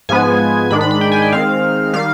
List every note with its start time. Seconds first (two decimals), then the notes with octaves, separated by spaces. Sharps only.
0.09 G#2 F3 G#3 B3 G#5
0.70 G#2 D#3 G#3 D4 B5
0.81 B5
0.91 B5
1.01 G5
1.12 G#5
1.22 G5
1.32 D#3 G#3 C4 F5
1.93 D#3 G3 F5